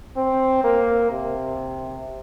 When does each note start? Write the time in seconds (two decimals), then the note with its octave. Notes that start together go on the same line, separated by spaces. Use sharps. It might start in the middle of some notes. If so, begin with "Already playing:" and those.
0.17 C4
0.64 A#3
1.11 C3